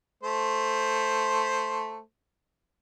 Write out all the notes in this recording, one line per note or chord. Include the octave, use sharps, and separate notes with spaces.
A3 C5